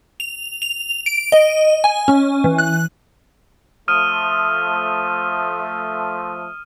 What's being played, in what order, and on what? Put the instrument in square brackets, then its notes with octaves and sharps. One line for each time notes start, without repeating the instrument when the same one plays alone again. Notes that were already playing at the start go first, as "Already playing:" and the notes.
[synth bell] F7
F7
D7
D#5
G#5
C#4
E3
F#6
[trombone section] F3 A3 [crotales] D#6 F6 D#7